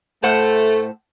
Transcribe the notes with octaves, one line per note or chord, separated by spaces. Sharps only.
A2 A3 C5 F#5